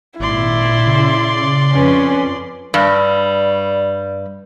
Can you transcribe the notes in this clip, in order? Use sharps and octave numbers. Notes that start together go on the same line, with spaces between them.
G#1 A#2 E4 D5 C6
C#3
F2 C#4 B4
G2 G3